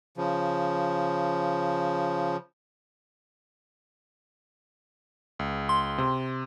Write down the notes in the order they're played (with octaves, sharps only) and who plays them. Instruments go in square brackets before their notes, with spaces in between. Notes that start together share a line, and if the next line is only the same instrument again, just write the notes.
[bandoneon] C#3 F3
[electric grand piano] C#2
[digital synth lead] C6
[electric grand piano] C3